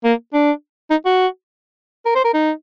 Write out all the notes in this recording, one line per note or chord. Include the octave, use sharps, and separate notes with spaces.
A#3
D4
D#4
F#4
A#4
C5
A#4
D#4